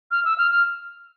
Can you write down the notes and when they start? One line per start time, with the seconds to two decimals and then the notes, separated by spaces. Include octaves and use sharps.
0.11 F6
0.25 E6
0.38 F6
0.51 F6